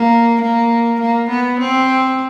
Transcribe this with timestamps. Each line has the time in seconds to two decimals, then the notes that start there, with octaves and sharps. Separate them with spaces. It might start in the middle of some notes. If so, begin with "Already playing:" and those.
Already playing: A#3
0.41 A#3
1.00 A#3
1.29 B3
1.59 C4